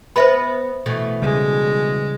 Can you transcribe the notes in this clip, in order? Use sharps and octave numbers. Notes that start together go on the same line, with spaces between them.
B3 B4 C5 E5 B5
B2 E3 A3
C#3 G3 G#3